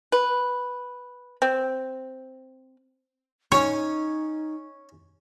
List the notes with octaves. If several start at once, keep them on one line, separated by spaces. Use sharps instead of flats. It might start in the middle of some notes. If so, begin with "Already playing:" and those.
B4
C4
C#4 D#4 C#5 G#5